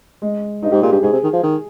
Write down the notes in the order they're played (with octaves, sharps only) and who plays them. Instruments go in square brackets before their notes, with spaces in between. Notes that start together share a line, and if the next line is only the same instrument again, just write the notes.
[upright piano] G#3
[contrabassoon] G2 [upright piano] D#4
[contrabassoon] G#2 [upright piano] G4
[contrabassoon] A#2 [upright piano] G#4
[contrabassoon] G2 [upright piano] G4
[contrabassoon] G#2 [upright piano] G#4
[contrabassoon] C3
D#3
F3
D#3